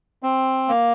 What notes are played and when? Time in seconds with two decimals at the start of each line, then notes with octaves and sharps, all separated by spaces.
0.23 C4
0.68 A#3